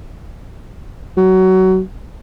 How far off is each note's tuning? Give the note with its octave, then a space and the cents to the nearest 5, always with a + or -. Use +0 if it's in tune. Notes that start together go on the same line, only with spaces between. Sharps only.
F#3 +20